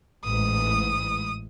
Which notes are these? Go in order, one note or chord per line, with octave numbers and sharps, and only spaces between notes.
A1 G#2 D#6